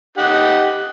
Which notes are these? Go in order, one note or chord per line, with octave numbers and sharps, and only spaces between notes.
D#4 G4 F#5